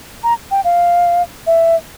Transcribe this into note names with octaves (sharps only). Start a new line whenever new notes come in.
A#5
G5
F5
E5